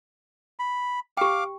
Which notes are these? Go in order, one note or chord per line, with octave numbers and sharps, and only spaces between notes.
B5
G4 F5 G5 D6